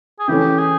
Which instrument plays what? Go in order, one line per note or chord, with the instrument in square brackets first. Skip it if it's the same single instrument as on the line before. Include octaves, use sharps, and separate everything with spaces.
[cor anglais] G#4
[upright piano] C#3 E3 A3 C#4 [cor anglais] G4
[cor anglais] G#4